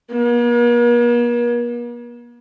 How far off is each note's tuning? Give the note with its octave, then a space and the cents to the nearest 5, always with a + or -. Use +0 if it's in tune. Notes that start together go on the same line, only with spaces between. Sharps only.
A#3 +45